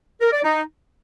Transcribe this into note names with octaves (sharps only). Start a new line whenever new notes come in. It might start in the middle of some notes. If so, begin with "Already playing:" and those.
A#4
D5
D#4